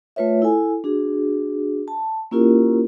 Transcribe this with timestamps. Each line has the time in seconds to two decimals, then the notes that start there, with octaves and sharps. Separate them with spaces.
0.16 A3 F4 B4 C#5 E5
0.42 E4 A4 G#5
0.84 D4 F#4 G#4
1.88 A5
2.31 A#3 C#4 E4 F4 G4 A#4